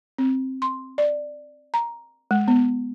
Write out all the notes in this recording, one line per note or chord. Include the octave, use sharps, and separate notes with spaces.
C4
C6
D5
A#5
G#3
B3